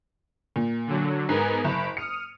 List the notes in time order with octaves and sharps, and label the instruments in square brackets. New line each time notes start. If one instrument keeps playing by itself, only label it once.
[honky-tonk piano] A#2
[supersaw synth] D3 F#3
[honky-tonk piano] G#2 [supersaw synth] B3 A#4 G#5
[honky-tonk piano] F#1 [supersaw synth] B5 D7
[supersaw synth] D#6 F6 [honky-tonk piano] C#7